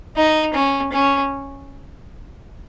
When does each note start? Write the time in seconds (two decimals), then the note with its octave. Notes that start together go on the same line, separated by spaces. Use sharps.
0.16 D#4
0.54 C#4
0.92 C#4